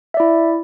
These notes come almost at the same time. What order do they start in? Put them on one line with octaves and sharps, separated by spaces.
E5 D5 E4